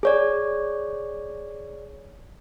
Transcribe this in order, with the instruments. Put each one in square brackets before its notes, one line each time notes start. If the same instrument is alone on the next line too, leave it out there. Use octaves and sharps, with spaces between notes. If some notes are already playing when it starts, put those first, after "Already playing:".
[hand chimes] G#4 C#5 D5